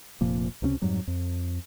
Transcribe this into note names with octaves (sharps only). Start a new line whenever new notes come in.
F1 A#2 F3 A#3
C#2 C3 A3 C#4
F2 G#2 F#3 G3
F2